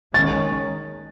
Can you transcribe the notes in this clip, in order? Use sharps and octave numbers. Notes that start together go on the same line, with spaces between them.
D#3 G#3 C#4 A6